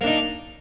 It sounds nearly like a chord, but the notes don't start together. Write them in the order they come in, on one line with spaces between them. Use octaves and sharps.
A#3 D4 D#4